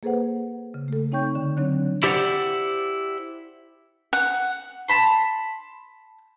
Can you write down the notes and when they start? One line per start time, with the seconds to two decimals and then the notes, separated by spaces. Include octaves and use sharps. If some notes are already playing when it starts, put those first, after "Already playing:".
0.03 A#3 G#4 A4 B4 C5 F#5
0.74 C#3
0.88 A3 A4
1.12 C4 D#4 C#5 G5 C#6 G6
1.35 D3
1.57 F#3 C4 D4 C#5 F#6
2.03 E4 G4 C5 D5 D#5 F#5
4.13 F#5
4.88 A5 B5 C6